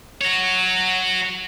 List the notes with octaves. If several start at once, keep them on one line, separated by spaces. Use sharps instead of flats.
F#4 C#5